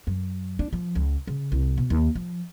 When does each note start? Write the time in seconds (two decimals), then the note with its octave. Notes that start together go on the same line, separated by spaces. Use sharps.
0.07 F#2
0.59 D4
0.73 F3
0.95 C#2
1.27 C#3
1.52 C2
1.78 B2
1.90 D#2
2.15 F3